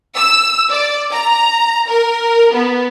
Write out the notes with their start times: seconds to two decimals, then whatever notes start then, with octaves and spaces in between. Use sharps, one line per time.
0.16 E6
0.70 D5
1.12 A#5
1.88 A#4
2.52 B3